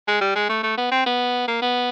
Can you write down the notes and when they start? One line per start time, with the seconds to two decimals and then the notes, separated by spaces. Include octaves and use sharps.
0.08 G#3
0.21 G3
0.35 G#3
0.49 A3
0.63 A3
0.78 B3
0.91 C4
1.06 B3
1.48 A#3
1.62 B3